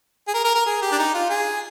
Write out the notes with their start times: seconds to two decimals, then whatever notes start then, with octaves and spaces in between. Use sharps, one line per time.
0.28 G#4
0.34 A#4
0.44 A#4
0.55 A#4
0.66 G#4
0.82 G4
0.92 D4
0.99 D#4
1.14 F4
1.30 G#4